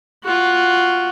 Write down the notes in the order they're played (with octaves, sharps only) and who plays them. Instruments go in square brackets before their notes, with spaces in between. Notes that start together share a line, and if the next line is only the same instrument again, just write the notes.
[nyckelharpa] F4 F#4